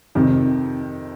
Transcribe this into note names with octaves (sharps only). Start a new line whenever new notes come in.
F2 C3 D#3